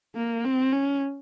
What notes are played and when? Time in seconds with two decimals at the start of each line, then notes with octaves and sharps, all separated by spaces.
0.15 A#3
0.45 C4
0.72 C#4